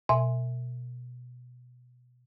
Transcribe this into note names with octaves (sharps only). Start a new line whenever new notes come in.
B2 E5 G#5